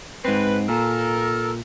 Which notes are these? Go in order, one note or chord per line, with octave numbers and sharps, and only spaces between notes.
G#2 C4 B4
A#2 A4 A#4